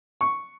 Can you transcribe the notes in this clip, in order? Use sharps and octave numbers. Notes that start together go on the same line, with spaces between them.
C#6